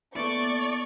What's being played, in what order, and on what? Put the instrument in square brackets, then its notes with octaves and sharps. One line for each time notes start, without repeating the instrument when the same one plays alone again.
[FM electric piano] A#3 B3 [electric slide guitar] E4 A4 [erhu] D5 [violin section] C#6